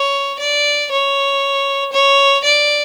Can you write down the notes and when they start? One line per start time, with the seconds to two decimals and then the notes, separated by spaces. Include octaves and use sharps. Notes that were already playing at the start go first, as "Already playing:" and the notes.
Already playing: C#5
0.39 D5
0.91 C#5
1.93 C#5
2.44 D5